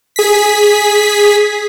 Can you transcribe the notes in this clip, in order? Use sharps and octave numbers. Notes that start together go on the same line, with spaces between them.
G#4 B6